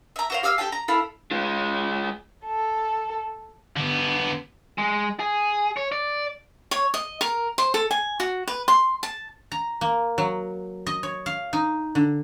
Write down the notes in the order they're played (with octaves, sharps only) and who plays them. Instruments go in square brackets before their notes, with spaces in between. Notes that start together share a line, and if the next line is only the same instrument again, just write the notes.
[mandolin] E5 A#5
F#4 C5 F5
G4 F5 E6 F6
G4 A4 G5 A5
A#5
E4 A4 F5 B5
[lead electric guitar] G#3 F4
[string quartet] A4
[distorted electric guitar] D3 B3
[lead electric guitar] G#3
G#4
C#5
D5
[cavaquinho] C#5
D#5
A#4
C5
A4
G#5
F#4
B4
C6
A5
[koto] A#5
A#3
F#3
D#5
C#5
F5
D#4
D3